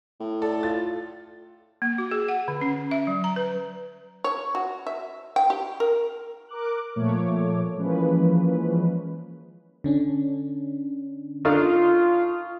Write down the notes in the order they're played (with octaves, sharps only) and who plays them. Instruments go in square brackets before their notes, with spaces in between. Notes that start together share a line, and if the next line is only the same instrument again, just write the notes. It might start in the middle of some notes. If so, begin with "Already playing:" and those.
[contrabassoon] A2
[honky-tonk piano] A4 [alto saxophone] D5
[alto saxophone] F4 [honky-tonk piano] A6
[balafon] A#3
F#4
G#4
F#5
D3
C#4
E5
F#3
A#5
B4
[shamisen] C#5
F#4
E5
G5
G4
A#4
[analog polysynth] A#4 D6 F#6
A#2 F3 A3 C#5 D6
E3 F3 G#3 A#3 C#4 B4
[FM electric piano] D3 C#4 D4
[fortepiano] D4 D#4 A4 [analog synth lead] F4 [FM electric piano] C#6 D#6 F6